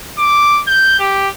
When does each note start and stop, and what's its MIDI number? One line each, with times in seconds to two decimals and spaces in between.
0.18 0.61 86
0.67 0.97 91
0.99 1.29 67